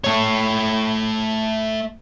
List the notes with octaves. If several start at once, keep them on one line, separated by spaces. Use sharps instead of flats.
A3 C#5